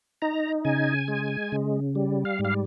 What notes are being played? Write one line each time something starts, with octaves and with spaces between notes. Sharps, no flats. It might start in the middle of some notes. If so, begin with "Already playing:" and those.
D#4 A#5
C#3 G#5
G#3
C#3
G3
F5
G#2
F5